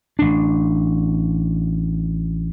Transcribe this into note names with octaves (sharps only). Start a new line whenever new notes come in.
A1 D4